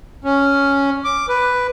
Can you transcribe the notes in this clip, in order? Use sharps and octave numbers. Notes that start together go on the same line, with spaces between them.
C#4
D6
B4